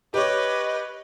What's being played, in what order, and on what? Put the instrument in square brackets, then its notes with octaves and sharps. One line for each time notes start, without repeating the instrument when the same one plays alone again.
[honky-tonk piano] G4 C#5 [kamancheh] B4 [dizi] D#5